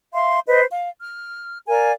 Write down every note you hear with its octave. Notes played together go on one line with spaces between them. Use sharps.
E5 F5 C6
B4 C5 D#5
F5
F6
A#4 D5 F5 G#5